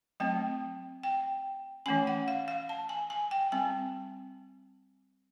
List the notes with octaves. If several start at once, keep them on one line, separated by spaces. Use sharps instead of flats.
F#3 A3 C4 G5
G5
E3 A3 C#4 G#5
F#5
F5
F5
A5
G#5
G#5
G5
G3 C4 G#5